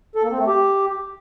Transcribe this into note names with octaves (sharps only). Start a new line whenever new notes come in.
A4
A#3
C4
A3
G4